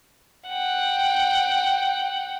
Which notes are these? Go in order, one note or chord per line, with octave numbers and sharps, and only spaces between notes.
F#5 G5